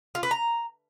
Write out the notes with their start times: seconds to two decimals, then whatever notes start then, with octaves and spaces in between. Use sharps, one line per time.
0.15 F4
0.23 B4
0.31 A#5